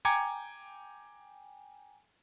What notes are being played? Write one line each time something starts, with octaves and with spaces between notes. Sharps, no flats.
G5 G#5 A#5 D6 G#6 C#7